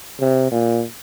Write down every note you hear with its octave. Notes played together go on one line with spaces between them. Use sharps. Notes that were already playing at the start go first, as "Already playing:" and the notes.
C3
A#2